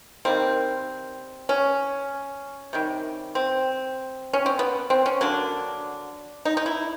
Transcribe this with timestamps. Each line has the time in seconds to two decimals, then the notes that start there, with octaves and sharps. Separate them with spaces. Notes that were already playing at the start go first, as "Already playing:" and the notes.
0.25 D#3 G3 A#3 C4
1.49 C#4
2.73 C3 D#3 G3
3.35 C4
4.33 C#4
4.46 C4
4.59 B3
4.90 C4
5.06 C#4
5.21 D3 F#3 A#3 D4
6.45 D#4
6.57 D#4
6.66 E4